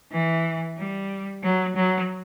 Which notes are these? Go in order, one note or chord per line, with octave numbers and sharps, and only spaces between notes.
E3
G3
F#3
F#3